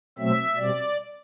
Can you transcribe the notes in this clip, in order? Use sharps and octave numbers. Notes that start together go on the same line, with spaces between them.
B2 F#3 A3 C4 E5
B2 G3 C4 D5